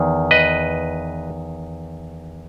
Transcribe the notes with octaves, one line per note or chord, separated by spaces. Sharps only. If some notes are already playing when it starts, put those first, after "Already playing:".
Already playing: E2 D#3
B4 D#5